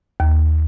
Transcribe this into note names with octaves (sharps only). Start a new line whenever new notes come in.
D#2